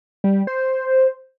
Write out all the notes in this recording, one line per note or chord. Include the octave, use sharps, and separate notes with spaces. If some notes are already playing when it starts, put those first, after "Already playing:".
G3
C5